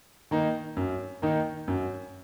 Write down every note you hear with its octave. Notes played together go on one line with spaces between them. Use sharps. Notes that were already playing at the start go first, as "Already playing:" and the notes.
D#3 A#3 D#4
F#2
D#3 A#3 D#4
F#2